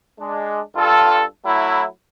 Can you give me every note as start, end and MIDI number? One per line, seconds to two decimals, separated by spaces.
0.19 0.61 56
0.19 0.61 62
0.76 1.23 43
0.76 1.23 65
0.76 1.23 69
1.45 1.85 54
1.45 1.85 57
1.45 1.85 64